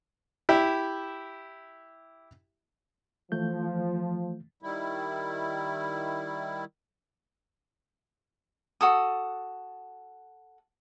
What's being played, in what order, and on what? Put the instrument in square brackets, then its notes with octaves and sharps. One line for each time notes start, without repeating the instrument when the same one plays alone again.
[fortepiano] E4 G4 E5
[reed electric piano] E3 A3 G6 [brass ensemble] F3
[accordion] D#3 G3 E4
[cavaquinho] F#4 A4 D#6